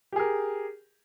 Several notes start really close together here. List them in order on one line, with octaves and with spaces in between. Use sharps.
G4 G#4 A#4